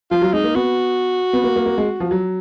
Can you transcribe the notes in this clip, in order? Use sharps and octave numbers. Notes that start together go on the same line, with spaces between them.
F3 F4
F#3
G#3 D#4
A#3
B3 F#4
B3
A#3
A#3
A#3
G#3
F3
F#3